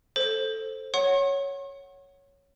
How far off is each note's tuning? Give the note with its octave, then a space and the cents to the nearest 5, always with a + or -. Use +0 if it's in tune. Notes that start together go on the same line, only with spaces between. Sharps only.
A4 +0 C5 +10
C#5 +0 F#5 +5 C#6 -45